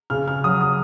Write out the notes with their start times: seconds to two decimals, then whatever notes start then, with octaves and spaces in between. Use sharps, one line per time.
0.10 C#3 F6
0.28 F6
0.44 F#3 D#6
0.61 D#6